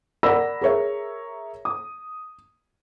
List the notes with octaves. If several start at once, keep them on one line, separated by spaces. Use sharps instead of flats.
A#4 D5 F#5 B5 E6 A#6
G#4 A#4 C#5 E5
D#6